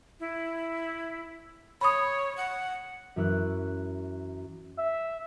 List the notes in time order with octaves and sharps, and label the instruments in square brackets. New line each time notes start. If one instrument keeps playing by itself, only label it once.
[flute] E4
[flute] C#5 [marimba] B5 D#6
[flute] F#5
[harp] F#2 E3 C#4 E4 E6 F#6
[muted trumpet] E5